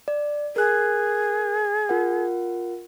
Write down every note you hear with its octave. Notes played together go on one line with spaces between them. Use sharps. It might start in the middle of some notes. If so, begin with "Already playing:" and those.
D5
G#4 A#4 F#6
F4 A#4 F#5